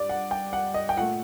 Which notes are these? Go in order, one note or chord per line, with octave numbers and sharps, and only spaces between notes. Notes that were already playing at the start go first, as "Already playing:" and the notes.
Already playing: G2 D5
F#5
G5
F#5
D#5
G5
A#2 A3 F#5